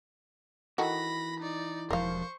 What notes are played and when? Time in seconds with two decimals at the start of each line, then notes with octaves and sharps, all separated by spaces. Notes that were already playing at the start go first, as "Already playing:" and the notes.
0.78 D#3 E3 F#4 A4 B5 A#6
1.40 D#4 D5
1.91 E1 F3 A#4 C5 F5 C#6